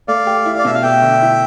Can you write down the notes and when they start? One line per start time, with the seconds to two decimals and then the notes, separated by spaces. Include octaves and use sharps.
0.08 A3 D5 F5
0.27 G4
0.45 E4
0.59 D5
0.65 B2 E5
0.75 F5
0.83 A3 E5 G5
1.02 D3
1.21 E4